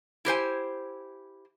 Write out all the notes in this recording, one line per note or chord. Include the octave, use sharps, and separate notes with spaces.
E4 G4 C5 G#5